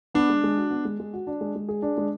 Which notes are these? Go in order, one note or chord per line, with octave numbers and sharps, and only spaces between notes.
B3 D4
G#3
G#3
F#4
B3
G#3
G#3
F#4
D4
G#3
G#3
G#4
D4
G#3